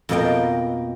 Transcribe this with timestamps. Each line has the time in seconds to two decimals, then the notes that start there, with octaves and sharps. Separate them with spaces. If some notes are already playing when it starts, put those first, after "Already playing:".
0.09 F2 B2 A#3 D#5 G5